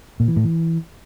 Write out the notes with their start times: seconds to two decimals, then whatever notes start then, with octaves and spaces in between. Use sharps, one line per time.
0.20 A#2
0.28 E3
0.36 A2
0.45 E3